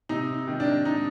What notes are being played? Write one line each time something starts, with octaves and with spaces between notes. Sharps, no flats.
C3 D#4
D#3
D4
D#4